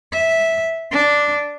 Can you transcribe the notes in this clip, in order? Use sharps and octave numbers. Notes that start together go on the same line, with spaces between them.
E5
D4